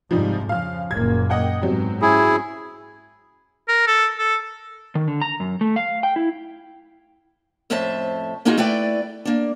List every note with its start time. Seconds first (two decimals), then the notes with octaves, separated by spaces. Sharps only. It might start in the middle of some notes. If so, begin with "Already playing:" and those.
0.11 F2 G#2 C3 F3 G3 D#4
0.49 C#3 F3 F5 F6
0.91 F#1 A#2 A#3 G#6
1.30 D#5 F#5 G5
1.61 G#2 B2 F#3 C4 G4
2.02 C#4 E4 G#4
3.68 A#4
3.87 A4
4.18 A4
4.95 D#3
5.08 D3
5.21 A#5
5.40 F#2
5.61 A3
5.76 F5
6.03 G5
6.16 E4
7.70 F2 A2 C#4 C5 E5 A5
8.45 A#3 C#4 D#4 F4 F#4 G#4
8.57 A3 E4 B4 D5 G5
9.25 A#3 D4